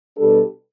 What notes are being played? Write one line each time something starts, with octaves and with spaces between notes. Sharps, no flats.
B2 G3 D4 A4